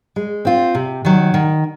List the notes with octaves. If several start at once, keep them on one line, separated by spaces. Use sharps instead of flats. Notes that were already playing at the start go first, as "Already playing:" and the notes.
G#3
C4 F4
C3
D#3 F#3
D#3